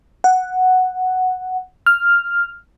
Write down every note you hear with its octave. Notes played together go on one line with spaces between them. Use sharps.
F#5
F6